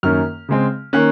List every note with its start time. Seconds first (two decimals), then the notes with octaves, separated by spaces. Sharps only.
0.03 F#2 D#3 A#3 C#4 F6
0.49 C#3 G#3 C4
0.93 D#3 A#3 C#4 F#6